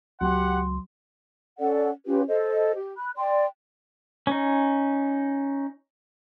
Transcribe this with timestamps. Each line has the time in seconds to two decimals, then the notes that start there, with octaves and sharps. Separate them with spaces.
0.21 C#2 F#3 G4 F#5 C6
1.59 C#4 A4 D5 F#5
2.06 C#4 F4 G4 B4
2.28 A4 C5 D#5
2.76 G4
2.97 B5 F#6
3.16 D5 G5 C6
4.27 C#4 D#4